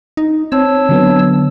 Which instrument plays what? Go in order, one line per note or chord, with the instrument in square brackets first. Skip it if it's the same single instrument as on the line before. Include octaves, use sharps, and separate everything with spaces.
[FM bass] D#4
[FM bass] C4 [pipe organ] C#5 A5 E6
[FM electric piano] D3 F#3 B3